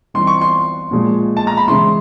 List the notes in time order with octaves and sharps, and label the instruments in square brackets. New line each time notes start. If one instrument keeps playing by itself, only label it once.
[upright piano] E3 G3 C4 D#4 [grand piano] C6
[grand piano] C#6
C6
[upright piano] A#2 F3 G#3
[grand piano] A5
A#5
B5
[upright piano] C#3 E3 G#3 C#4 E4 [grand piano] C6